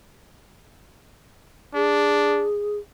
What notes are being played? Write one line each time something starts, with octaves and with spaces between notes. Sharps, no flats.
D4 G#4